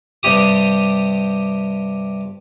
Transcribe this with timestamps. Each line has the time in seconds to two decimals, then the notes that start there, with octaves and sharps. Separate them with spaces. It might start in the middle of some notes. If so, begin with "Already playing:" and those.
0.23 G2 C3 G4 D#6